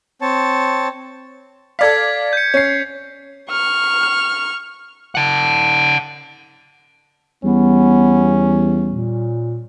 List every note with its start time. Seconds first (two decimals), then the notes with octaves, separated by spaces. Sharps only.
0.22 C4 C#5 A5
1.79 A4 D5 F5 G#6 B6
2.33 G6 C#7
2.54 C#4 C7
3.50 C#6 F6
5.15 F#5 A5
7.44 E2 G3 B3 C#4
8.88 A#2